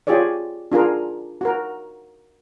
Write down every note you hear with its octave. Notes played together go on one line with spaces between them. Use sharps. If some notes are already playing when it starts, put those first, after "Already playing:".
F4 G4 G#4 C#5 D5
D4 F4 G#4 A#4
F#4 A#4